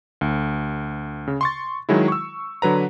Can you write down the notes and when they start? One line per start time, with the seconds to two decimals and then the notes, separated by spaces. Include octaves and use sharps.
0.21 D2
1.28 C#3
1.41 C6 C#6 A6
1.89 D#3 F#3 G#3 E4
2.08 C#6 E6
2.62 D3 F#3 B4 A#5